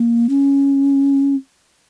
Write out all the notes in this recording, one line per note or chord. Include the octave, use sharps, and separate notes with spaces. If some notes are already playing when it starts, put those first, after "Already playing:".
Already playing: A#3
C#4